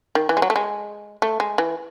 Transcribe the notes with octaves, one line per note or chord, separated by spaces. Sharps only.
D#3
E3
G#3
F#3
A3
G#3
A3
G#3
E3